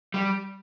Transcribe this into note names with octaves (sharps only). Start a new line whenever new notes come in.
G3